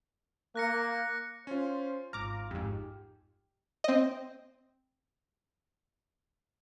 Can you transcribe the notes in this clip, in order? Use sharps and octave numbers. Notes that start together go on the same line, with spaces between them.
A#3 F#6 A#6 C#7
C#4 F4 C5
G#1 F4 A#5 D6 F6
F2 G#2 G4
C4 D#5